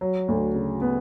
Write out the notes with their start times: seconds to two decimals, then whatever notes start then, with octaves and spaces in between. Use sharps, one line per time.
0.01 F#3
0.28 D2
0.55 C#3
0.81 B3